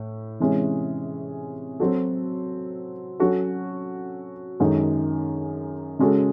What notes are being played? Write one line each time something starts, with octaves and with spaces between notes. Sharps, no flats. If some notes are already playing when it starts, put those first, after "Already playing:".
Already playing: A2
C3 E3 G#3 C#4
F#3 C4 F#4 A4
F#3 C#4 F#4 A4
F#2 D#3 G#3 D#4 A4
C#3 G#3 C#4 F#4 A4